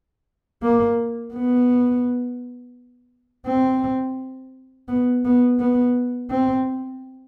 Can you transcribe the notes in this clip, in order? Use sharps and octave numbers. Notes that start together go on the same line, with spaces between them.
A#3
B3
C4
B3
B3
B3
C4